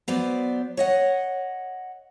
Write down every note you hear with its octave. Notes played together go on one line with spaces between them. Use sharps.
F#3 B3 C5 D5
C#5 D#5 F#5